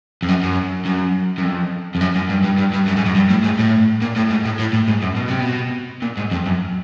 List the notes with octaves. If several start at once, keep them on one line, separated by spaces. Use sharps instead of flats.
F2
F#2
F#2
F#2
F#2
F2
F2
F#2
F#2
G2
G2
G2
G2
F#2
G#2
F#2
G2
A2
G#2
A2
A#2
A2
G#2
A2
A2
A2
G#2
F#2
B2
C3
B2
A#2
G#2
F2
F#2